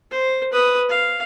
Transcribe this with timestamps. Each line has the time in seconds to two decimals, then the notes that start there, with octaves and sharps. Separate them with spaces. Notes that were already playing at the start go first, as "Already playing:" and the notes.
0.11 C5
0.53 B4 D#6
0.89 F5